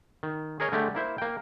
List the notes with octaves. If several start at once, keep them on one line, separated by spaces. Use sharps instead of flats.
D#3
G#4 A#4 C#5 D#5
D3 G#3 A3 G4
A#3 E4 C5 E5
A#3 G5